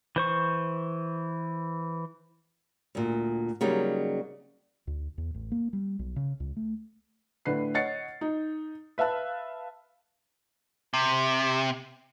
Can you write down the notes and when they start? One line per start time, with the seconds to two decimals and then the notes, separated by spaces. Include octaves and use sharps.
0.16 E3 C5 C#6
2.95 D2 A#2
3.61 C#3 F#3 G3 A#3 D#4
4.87 D2
5.18 E2
5.34 A1
5.52 A#3
5.73 G3
5.99 B1
6.16 C#3
6.40 C#2
6.56 A3
7.46 A2 D3 B4 C7
7.74 C#5 D#5 F#5 A6 C7 C#7
8.21 D#4
8.98 B4 E5 F5 A5 F#6
10.94 C3